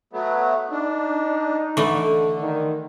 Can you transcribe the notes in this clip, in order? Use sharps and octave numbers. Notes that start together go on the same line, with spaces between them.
F#3 A3 B3
D4 D#4
D3 E3 A3
D#3